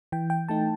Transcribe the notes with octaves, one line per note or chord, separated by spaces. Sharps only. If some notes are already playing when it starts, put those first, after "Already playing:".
E3 G5
G5
A3 D#4 A5